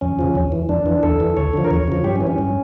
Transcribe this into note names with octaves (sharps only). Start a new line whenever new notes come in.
F2 C#4
C#3 F3
E2
E3
F2 D4
E3
E2 A4
E3
D2 C#5
D3 F3
A#4
E2 C#5
C#3 F3
G2 G4
C#4
E3
C#4
G2